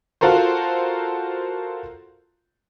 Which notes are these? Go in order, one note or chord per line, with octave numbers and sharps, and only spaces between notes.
F4 F#4 A4 A#4 C5